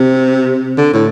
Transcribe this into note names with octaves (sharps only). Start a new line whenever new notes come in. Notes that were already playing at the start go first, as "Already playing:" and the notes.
Already playing: C3
D3
A2